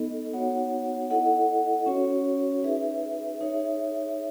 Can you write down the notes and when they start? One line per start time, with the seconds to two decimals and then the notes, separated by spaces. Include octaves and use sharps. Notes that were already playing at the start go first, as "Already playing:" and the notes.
Already playing: B3 D#4 A4 D#5
0.33 B3 D#4 F#4 C#5 F#5
1.10 E4 A4 D#5 F#5
1.86 C#4 F#4 C#5
2.63 D#4 G#4 B4 E5
3.41 D#4 G#4 C#5 E5